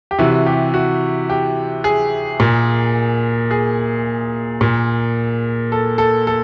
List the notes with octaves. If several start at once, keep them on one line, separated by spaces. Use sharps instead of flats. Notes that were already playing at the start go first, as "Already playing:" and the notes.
G4
C3 E3 F#4
G4
F#4
G4
G#4
A#2
G#4
A#2
A4
A4
A4